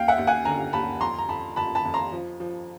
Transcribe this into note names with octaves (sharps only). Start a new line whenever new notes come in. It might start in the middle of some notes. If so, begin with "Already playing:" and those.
Already playing: D#2 F5 G5
E5 F#5
D#2
F#5 G#5
D3 G#5 A#5
D#2 A5 B5
F2 A#5 C6
A#5
F2 A5 B5
F2 A5 B5
A5 B5
F2
A#5 C6
F3
F3